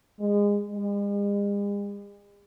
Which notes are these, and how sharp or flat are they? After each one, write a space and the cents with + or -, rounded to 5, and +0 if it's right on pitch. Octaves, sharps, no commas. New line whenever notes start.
G#3 -25
G#3 -45